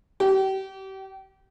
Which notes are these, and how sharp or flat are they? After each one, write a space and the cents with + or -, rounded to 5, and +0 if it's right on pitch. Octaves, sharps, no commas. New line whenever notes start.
G4 -35